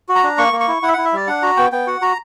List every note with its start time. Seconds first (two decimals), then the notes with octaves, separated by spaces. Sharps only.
0.09 F#4
0.16 A#5
0.23 D4
0.38 A#3 C#6
0.53 A#3
0.60 C#6
0.68 E4
0.82 E4 F#5
0.88 E5
0.93 E4 F#5
1.05 E5
1.13 G3 D5
1.27 D4 F#5
1.42 F#4 A#5
1.57 B3 G5
1.72 B3 G5
1.87 F#4 F#5
2.02 F#4 A#5